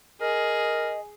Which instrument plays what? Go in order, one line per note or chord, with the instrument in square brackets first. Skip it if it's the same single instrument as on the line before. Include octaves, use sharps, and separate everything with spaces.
[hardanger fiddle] G#4 [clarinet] A#4 [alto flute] D#5